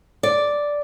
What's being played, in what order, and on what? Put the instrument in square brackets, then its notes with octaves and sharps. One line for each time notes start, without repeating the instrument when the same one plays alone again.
[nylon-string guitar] D5